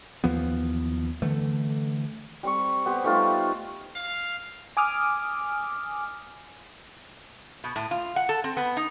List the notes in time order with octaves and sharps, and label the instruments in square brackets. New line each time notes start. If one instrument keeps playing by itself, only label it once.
[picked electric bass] D#2 E3 F3 B3
D3 E3 A3
[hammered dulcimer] G3 C4 C#6
B3 G4 C5
G3 A3 D#4 F4
[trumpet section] F5
[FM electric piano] G#5 D6 D#6 F6
[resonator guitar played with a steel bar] B2
A2
F4
F#5
A4
C4
B3
D#4